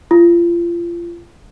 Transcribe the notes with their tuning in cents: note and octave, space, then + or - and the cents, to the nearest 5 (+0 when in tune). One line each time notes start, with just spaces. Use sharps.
F4 -30